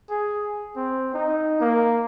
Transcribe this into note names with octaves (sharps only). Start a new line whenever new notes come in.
G#4
C4
D#4
A#3